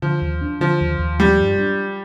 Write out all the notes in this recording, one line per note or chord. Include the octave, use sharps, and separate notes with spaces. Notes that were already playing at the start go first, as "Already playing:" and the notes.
D3 F3
D#2
D4
D3 F3
D#2
D#2
F3 G3
G2
D4